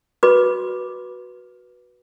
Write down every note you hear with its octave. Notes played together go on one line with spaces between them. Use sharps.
F#4 B4 B5 D6